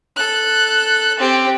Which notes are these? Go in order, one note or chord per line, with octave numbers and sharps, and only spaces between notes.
A4 F#6
C4 G4